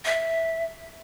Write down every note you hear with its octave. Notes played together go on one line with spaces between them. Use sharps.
E5